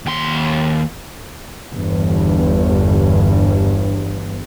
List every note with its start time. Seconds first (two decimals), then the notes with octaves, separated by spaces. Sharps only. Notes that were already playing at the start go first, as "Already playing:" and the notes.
0.06 D#2 C6
1.73 G1 E2 G2